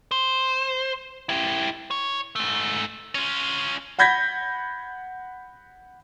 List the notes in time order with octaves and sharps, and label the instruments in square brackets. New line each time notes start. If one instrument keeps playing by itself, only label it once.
[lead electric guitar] C5
E4 G4
C#5
G#2 A3
[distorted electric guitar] C#4 F4
[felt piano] F#5 B5 G6 G#6 A#6 B6